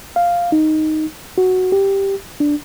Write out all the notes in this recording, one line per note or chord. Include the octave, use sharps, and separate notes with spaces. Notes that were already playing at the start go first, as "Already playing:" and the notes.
F5
D#4
F#4
G4
D4